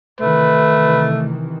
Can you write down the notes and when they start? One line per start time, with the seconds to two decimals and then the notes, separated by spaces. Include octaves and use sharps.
0.21 C3 D#3 E3 A3 B4